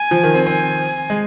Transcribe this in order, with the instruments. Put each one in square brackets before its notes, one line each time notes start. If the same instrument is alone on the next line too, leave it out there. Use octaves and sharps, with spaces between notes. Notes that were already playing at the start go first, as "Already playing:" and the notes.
Already playing: [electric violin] G#5
[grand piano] F3
D#3
C4
[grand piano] C4 [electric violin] G#5
[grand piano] G#3